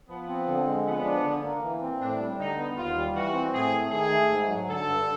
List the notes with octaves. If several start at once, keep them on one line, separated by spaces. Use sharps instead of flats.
F3 B3
C4
D3
G#3
F3 B3
D4
D3
A#3
E3
C4
A2 D4
G3
D3 D#4
B3
D#2 F4
G3
E3 F#4
C4
A2 G#4
A3
D#3 G#4
A3
G#2
F#3
D3 A4
G2